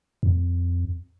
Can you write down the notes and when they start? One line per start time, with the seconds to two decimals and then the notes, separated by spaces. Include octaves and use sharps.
0.23 F2